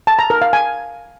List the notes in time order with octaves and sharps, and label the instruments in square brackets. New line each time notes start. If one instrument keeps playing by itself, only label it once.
[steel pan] A5
A#5
A#4
F5
G#5